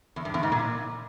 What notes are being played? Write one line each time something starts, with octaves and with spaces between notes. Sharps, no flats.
E2
G2
E2
G#2
A#2